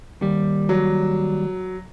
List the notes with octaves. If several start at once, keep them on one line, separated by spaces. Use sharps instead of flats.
D#2 G3
F#3